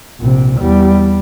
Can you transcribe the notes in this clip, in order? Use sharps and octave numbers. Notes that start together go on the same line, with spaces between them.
A#1 C3
E2 G3